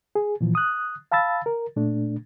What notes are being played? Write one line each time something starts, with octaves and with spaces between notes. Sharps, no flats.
G#4
A#2 E3 F3
D#6 F#6
F5 A5 B5 E6 A6
A#4
A#2 A3 D4